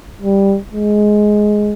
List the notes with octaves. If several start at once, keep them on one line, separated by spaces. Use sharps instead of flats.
G3
G#3